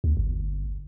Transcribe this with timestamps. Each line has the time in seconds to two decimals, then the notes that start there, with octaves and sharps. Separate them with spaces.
0.04 D2
0.17 G1